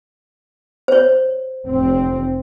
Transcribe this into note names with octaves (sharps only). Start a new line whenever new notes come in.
C5 C#5
F1 C4